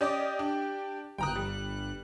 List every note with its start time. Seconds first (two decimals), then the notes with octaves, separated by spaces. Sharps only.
0.01 C#4 G4 D5 D#5
0.39 D4
1.18 G1 G5 A#5 D#6 F#6
1.35 G3